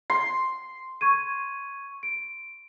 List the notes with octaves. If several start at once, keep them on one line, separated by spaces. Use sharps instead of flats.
C6
C#6 G#6 D#7
D7